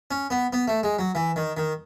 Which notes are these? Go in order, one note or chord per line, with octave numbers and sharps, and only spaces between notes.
C#4
B3
B3
A3
G#3
F#3
E3
D#3
D#3